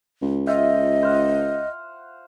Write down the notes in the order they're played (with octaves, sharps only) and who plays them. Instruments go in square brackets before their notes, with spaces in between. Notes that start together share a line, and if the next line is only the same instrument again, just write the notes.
[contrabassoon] C#2
[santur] F4 E5 G5 [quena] D#5
[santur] C5 F5 F#5